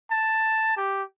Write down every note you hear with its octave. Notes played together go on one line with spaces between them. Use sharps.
A5
G4